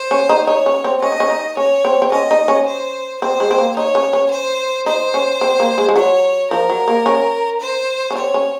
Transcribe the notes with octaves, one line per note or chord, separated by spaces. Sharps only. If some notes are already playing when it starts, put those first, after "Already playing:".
Already playing: C5
C#4
D#4
D#4 C#5
C#4
C4
C#4 D#5
D#4
C#4
D#4
C#4 C#5
C4
C4
C#4 D#5
D#4
C#4
C5
C4 C5
G#3
C4
A#3
D#4 C#5
C#4
C#4
C5
D#4 C5
C#4
C4
A#3
G#3
G#3
F#3 C#5
F3 A#4
F#3
A#3
C#4
C5
C#4
C4 C#5
C#4